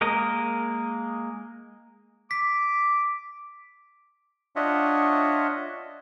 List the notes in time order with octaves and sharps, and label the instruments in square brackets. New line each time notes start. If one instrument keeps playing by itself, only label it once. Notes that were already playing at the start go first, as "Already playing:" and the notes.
[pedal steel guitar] G#3 A#3 A#4 D#5
[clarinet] D6 [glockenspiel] B6
[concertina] D4 F4 C#5 D#5 E5 F#5